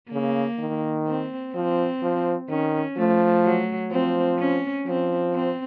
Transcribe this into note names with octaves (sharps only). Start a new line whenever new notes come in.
C#3 A#3
D#3
C4
F3 C4
F3
D#3 C#4
F3 A3
F#3
F3 C4
C#4
F3 C4
C4